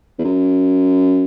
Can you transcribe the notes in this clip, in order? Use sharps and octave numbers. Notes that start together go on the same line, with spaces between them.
E2
F#2